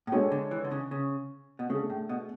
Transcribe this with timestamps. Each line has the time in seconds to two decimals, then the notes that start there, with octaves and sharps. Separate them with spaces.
0.07 A2
0.12 B2 G#3 D4 A4 C#5
0.32 D3
0.51 E3
0.65 D3
0.72 C#3
0.91 C#3
1.59 B2
1.70 C#3 A3 D4 G#4
1.90 A2
2.09 B2